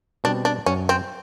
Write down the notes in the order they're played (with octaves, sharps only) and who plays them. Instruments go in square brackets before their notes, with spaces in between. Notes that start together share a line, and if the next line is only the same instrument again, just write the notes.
[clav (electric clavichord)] B2 G3 C4 [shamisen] D4
[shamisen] D4
[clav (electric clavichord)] F#2 [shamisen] C#4
[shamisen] C4